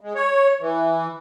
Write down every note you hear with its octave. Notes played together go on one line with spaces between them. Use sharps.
G#3
C#5
E3